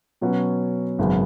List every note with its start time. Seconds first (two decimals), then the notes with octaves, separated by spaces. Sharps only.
0.21 B2 F#3 C#4 F#4 B4
0.99 G#1 F#2 C#3 F#3 B3